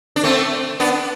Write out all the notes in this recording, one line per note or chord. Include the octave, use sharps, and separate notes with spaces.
D4
A3 C4
B3 D4